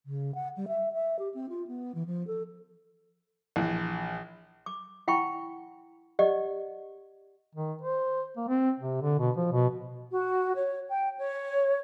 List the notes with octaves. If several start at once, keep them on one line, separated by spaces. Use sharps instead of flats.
C#3
F#5
G3
E5
E5
G4
C4
F4
B3
E3
F3
A4
A#1 E3
D6
E4 F#5 G5 B5 C#6
G4 D5 D#5 F#5
D#3
C5
A#3
C4
C3
D3
B2
F3
B2
F#4
C#5
G5
C#5